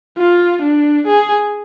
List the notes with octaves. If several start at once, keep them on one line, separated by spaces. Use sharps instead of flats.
F4
D4
G#4